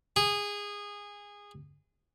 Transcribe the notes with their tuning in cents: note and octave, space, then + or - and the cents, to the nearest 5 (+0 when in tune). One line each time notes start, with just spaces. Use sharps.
G#4 -20